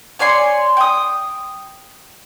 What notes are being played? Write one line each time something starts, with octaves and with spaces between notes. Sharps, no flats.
C#5 D5 G#5 C6
G5 D#6